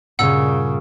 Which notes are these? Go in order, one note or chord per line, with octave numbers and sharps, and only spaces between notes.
G2 A#2 C#3 F#5 E6